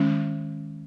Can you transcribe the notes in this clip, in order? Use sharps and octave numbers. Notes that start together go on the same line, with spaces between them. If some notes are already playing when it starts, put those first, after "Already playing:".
Already playing: D#3 G#3 C#4